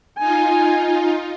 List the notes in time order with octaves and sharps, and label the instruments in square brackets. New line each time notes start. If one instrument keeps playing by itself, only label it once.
[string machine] D#4 F4 [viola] G#5